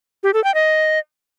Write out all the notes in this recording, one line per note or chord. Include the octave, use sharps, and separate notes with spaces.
G4
A4
G5
D#5